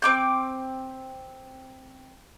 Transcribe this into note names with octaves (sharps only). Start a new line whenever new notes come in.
C4 D6 G6